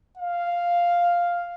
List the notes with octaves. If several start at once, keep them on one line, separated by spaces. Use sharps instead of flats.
F5